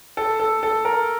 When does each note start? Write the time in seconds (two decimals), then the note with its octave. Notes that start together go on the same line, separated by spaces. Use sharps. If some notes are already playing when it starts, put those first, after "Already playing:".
0.17 A4
0.40 A4
0.63 A4
0.85 A#4